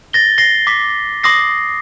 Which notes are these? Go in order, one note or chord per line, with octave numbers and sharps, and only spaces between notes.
A6 A#6 G7
A#6 C7 G7
D6 B6
C6 D6 D#6 A#6 C7